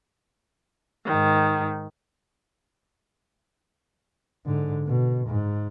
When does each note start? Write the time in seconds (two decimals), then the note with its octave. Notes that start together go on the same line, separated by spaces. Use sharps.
1.05 G#2 D#3
4.46 G#2 D3
4.87 B2
5.28 G#2